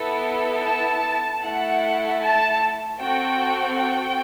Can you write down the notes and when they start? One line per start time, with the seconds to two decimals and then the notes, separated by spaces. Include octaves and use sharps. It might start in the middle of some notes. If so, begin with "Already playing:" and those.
Already playing: B3 E4 A4
0.65 A5
1.43 A3 E4 A4 F#5
2.22 A5
3.00 C4 F#4 A4 G5
3.77 G5